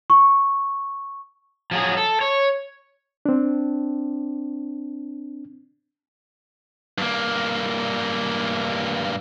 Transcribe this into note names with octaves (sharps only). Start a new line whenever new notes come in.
C#6
F3 F#3 G#4
A4
C#5
C4 D4
G2 A#3